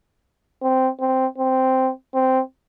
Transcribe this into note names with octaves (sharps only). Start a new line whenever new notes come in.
C4
C4
C4
C4